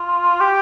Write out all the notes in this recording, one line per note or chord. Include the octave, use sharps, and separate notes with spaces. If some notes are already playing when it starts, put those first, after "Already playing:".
Already playing: F4
G4